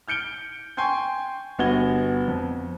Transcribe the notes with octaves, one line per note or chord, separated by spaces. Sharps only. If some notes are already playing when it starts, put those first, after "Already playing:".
F6 G6 C#7 D7 G7
G5 G#5 C6 C#6 G6
G1 B3 F#4 G#6 G7
F2